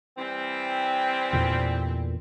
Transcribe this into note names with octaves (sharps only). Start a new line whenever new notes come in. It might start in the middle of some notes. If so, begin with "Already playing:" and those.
E3 G3 C4
E2 A#2 D3